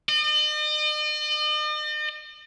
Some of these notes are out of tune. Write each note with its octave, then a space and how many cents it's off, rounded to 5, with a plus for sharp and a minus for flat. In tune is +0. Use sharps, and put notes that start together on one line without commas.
D#5 -45